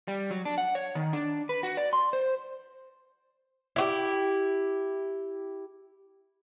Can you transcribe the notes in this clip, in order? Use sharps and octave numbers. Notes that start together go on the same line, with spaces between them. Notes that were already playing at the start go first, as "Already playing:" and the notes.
G3
F#3
D4
F#5
C#5
D#3
D4
B4
F#4
D5
C6
C5
E4 F#4 G4